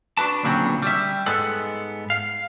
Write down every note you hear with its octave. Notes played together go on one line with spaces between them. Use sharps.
D4 F#4 B4 A5
D2 A#2 C#3 F#3 B3 C4
G3 E5
G#2 G#3 B3 A4 F#5
F5